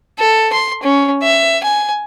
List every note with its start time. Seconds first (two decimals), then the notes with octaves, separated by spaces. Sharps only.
0.19 A4
0.53 C6
0.83 C#4
1.22 E5
1.63 G#5